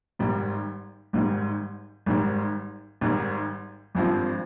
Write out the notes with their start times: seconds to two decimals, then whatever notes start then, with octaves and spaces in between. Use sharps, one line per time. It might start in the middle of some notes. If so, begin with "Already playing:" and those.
0.19 G#1 G#2 G3
1.13 G#1 G#2 G3
2.06 G#1 G#2 G3
3.01 G#1 G#2 G3
3.95 G#1 G2 F3 C4 F4